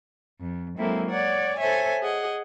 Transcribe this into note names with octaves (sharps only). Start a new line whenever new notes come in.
F2
F#3 G#3 A#3 C4 E4 A4
C#5 D5 F#5
A4 C5 C#5 E5 G#5
G#4 D#5 F#5